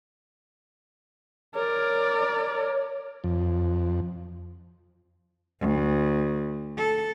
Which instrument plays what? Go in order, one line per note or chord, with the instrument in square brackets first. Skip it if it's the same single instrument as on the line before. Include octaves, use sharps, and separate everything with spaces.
[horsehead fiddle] A#4 D5 [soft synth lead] C#5
[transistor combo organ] F2
[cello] D2
A4